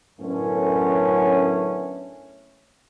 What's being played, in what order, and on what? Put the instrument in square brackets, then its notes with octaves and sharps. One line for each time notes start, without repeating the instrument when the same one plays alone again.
[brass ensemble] F#2 A2 D3 A3 B3 C#4